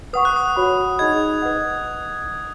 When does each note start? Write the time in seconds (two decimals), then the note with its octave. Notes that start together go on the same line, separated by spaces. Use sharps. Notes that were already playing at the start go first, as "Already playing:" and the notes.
0.13 B4 F#5 C#6 D#6
0.25 F#6
0.36 D#6
0.56 F#4 C#5 F#5 B5
0.98 D#4 G#4 D#5 B5 G#6
1.42 B4 D#5 F#5